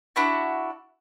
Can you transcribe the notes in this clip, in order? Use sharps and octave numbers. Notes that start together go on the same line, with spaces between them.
D4 E4 F#4